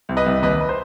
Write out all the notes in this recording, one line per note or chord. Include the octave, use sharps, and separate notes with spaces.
C2
B4 D#5
C2
D#2 B4 D#5
B4
C5